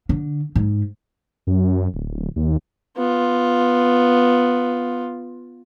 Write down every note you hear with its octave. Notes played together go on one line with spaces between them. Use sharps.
D3
G#2
F#2
D1
D#2
B3 F4